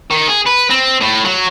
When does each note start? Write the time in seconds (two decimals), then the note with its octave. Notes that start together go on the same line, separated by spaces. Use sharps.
0.11 D#3
0.27 G#4
0.46 B4
0.70 C4
1.01 A2
1.25 F#3